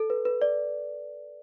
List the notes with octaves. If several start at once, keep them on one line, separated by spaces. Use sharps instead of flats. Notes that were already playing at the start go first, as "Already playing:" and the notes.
Already playing: A4
B4
B4
D5